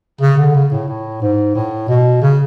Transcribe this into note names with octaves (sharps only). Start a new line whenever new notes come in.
C#3
D3
C#3
A2
A2
G#2
A2
B2
C#3